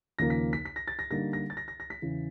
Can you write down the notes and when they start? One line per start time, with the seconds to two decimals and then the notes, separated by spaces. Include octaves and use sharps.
0.19 D#2 C#3 F3 A#3 A#6
0.30 B6
0.53 B6
0.65 B6
0.76 A#6
0.88 A6
0.99 A#6
1.10 D3 G3 A#3 D#4 A#6
1.33 A#6
1.50 A6
1.57 A#6
1.68 A#6
1.80 A#6
1.90 B6
2.02 E2 C#3 E3